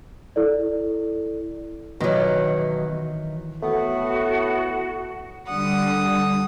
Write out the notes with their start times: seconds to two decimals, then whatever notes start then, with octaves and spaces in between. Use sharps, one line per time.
0.36 E4 A4 D5
2.00 B2 D#3 E3 F#3
3.63 A2 A3 B3 F#4
5.47 D3 G3 F#5 D#6